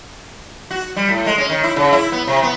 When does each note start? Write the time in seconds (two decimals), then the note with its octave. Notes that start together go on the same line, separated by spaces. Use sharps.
0.71 F#4
0.96 G3
1.09 A2
1.26 G#3
1.38 C#4
1.50 D#3
1.63 E4
1.76 C#3
1.93 E4
2.12 B3
2.27 C3
2.43 B3